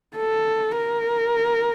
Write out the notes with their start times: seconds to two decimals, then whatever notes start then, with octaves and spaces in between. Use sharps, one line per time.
0.17 A4
0.77 A#4